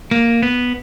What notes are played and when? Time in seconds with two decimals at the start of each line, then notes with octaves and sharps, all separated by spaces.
0.11 A#3
0.43 B3